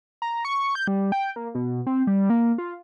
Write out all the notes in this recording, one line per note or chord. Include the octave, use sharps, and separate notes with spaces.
A#5
C#6
G6
G3
G5
A#3
B2
C4
G3
A#3
F4